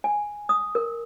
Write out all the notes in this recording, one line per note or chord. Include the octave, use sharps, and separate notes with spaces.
G#5
D#6
A#4